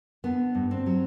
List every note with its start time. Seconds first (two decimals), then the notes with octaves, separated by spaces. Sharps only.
0.24 D3 B3
0.55 G2
0.71 C4
0.86 F#3